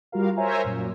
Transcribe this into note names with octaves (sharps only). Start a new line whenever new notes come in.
G3 F4 F#4 A#4 F5
A#4 C5 C#5 E5 G#5 A#5
F#2 A#2